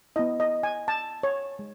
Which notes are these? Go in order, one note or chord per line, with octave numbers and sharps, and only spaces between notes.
B3 E4 D#5
D#5
G#5
A5
C#5
G#3